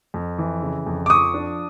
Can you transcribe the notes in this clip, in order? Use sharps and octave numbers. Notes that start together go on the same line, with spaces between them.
F2
E3
C#3
F2
D6
F3 C#6 D#6
D4